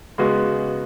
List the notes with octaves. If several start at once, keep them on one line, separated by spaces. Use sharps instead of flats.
C#3 G#3 B3 F#4